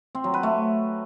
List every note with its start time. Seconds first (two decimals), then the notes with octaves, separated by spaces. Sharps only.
0.15 C4
0.24 F#3
0.34 B4
0.43 A3